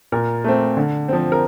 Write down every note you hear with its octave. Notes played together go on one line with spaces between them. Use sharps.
A#2 A#4
A3 C4
D3
F3 C4
A#4